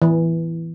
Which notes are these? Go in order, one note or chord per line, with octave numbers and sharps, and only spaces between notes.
E3